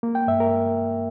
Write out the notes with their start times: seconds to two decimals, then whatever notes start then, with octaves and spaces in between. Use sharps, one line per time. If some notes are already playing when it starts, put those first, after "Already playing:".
0.03 A#3
0.15 G5
0.27 G2 E5
0.40 A#4